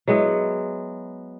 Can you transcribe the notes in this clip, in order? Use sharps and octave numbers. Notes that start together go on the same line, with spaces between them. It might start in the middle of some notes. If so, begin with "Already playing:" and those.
F#3 G#3 B3 E4